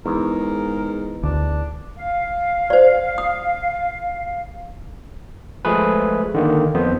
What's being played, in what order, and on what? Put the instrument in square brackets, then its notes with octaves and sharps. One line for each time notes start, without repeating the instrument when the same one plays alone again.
[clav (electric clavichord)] E2 [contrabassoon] G#2 [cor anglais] A#4
[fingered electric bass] D2 [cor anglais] D4
[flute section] F5
[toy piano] C5 D5
D#6
[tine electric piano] F3 G#3 A3 G#4 B4
D3 D#3 A#3
F2 B3 C5